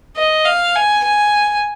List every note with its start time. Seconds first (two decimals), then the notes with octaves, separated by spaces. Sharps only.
0.16 D#5
0.46 F5
0.75 G#5
1.04 G#5